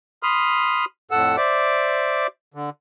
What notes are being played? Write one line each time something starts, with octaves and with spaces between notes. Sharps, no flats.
B5 C6 D#6 F6
F2 A2 A4 F#5 E6
C5 D5 E5 D6
D3